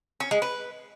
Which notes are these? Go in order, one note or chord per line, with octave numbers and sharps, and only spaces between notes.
C#4
G#3
B4